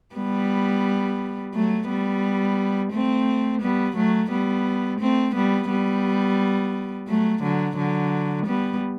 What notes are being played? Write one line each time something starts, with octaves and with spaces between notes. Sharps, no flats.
G3 B3
F#3 A3
G3 B3
A3 C4
G3 B3
F#3 A3
G3 B3
A3 C4
G3 B3
G3 B3
F#3 A3
D3 F#3
D3 F#3
G3 B3